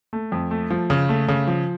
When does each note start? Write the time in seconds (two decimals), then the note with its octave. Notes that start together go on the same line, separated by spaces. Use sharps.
0.13 A3
0.32 F2
0.51 A3
0.70 F3
0.90 C#3
1.09 A3
1.28 C#3
1.47 F3